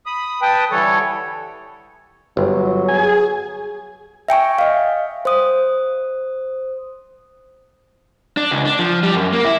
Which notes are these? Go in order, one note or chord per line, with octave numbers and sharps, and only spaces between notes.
B5 D#6
B4 G5 A5 D#6
D3 E3 G3 A4 C#5
G1 F#3
G#4 G#5
E5 G5 G#5 C#6
D#5 F5
C5 D#6
D4
C#2
D4
F3
G3
F#2
A#3
E4